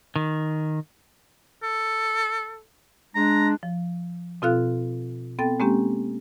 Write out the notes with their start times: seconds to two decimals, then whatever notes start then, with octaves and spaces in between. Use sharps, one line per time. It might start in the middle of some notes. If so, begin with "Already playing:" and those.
0.16 D#3
1.63 A4
3.15 G#3 D4 A#5
3.63 F3
4.42 B2 C4 F4 A4 F5 F#6
5.39 B3 C4 A4 G5 A6
5.60 G#3 A#3 C4 C#4 G4